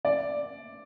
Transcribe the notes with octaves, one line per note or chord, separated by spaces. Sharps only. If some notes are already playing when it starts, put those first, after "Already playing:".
D5